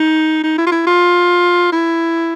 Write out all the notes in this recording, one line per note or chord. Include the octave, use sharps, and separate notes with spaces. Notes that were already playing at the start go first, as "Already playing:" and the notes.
Already playing: D#4
D#4
E4
F4
E4
F4
E4